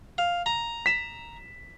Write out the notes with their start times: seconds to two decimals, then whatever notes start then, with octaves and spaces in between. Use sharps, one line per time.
0.18 F5
0.46 A#5
0.86 B6 E7